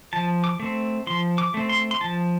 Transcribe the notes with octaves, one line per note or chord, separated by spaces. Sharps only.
F3 A5
D6
A3 C4
F3 C6
D6
A3 C4
C6
C6
F3 A5